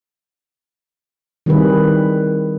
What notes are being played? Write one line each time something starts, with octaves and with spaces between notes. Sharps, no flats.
D#3 G3 C4 E4 G#4 B4